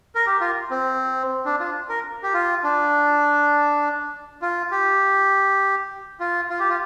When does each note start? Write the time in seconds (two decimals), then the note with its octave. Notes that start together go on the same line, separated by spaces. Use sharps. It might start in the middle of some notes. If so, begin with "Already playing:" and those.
0.15 A#4
0.26 G4
0.41 F4
0.71 C4
1.45 D4
1.60 F4
1.89 A#4
2.23 G4
2.34 F4
2.64 D4
4.42 F4
4.71 G4
6.20 F4
6.50 F4
6.59 G4
6.69 F4